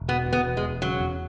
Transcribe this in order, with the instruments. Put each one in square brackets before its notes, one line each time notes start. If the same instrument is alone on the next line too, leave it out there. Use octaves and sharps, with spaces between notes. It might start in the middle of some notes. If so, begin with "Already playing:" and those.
Already playing: [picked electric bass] E1
[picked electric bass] B2 [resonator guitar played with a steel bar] B3
[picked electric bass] E2
[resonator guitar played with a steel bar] B3
[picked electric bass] E1
[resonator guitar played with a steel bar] G#3
[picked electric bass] E1
[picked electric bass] C#3 [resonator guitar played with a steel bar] F#3
[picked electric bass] E2